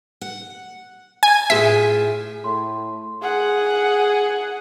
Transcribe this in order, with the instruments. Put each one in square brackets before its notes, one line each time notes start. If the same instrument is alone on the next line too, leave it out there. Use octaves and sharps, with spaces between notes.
[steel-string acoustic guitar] F#5
[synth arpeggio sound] G#5
[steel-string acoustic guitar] A2 F4 G#4 [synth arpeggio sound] E5
[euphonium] A2 [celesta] C6
[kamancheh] G#4 F#5